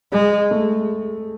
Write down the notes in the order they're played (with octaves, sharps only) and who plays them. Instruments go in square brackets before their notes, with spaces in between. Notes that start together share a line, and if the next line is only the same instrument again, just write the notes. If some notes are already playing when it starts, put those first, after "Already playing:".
[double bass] G#3 [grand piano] G#4
[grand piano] A3